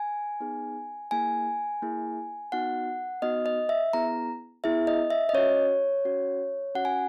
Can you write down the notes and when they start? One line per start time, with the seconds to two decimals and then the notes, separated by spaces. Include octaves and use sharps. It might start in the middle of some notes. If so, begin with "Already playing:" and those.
Already playing: G#5
0.40 B3 D#4 G#4
1.11 A#3 E4 G#4 G#5
1.82 A#3 E4 G#4
2.52 B3 D#4 F#4 F#5
3.22 B3 D#4 F#4 D#5
3.46 D#5
3.69 E5
3.93 B3 E4 G#4 A#5
4.64 B3 E4 G#4 E5
4.87 D#5
5.10 E5
5.29 D#5
5.33 C#4 F#4 C#5
6.05 C#4 F#4
6.75 C#4 F#4 F#5
6.85 G#5